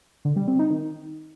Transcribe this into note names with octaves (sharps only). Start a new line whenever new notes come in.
D3
G3
C4
D#4
D#3